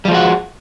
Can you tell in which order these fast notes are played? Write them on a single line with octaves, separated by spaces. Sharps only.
G3 F3 G#3 F#4